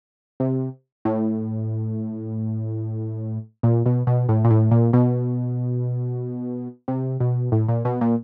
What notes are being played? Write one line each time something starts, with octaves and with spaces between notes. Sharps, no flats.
C3
A2
A#2
B2
B2
A2
A#2
A2
A#2
B2
C3
B2
A2
A#2
B2
A#2